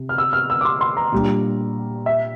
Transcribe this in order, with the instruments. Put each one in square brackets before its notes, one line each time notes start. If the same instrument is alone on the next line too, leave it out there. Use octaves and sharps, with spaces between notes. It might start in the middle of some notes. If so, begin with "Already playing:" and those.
Already playing: [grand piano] C3
[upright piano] F6
E6
F6
E6
D6
C6
C6
A#5
[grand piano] A#2 G3 D4 G4
[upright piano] E5